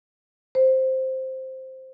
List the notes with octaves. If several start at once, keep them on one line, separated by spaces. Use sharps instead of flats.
C5